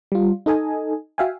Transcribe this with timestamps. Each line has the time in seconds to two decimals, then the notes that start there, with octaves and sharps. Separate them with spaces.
0.12 G3 F4
0.46 D#4 A4 D#5 G#5
1.18 F#4 E5 F5 G5 G#5